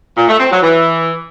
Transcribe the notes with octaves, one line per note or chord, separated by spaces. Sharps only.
A#2
A3
C4
F#3
E3